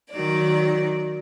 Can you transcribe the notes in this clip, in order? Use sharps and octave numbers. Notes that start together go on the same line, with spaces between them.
D#3 F#3 D5